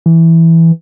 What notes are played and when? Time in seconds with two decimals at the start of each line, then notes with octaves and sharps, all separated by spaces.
0.06 E3